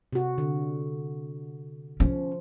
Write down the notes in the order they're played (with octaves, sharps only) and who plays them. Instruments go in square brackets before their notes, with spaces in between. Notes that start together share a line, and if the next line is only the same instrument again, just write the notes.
[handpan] C3 F#4
D3
[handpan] F3 [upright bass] C#4